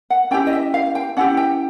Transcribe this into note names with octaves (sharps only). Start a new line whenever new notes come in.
F#5
C#4 E4 G4 G5
D#5
E5
F5
G5
C#4 E4 G4 F#5
G5